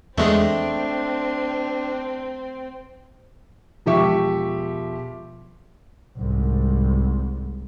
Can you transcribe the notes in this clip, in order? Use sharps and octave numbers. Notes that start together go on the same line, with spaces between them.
E2 G#3 A3 C4 D4
E1 F3 G4 E5 C#6
C2 G#2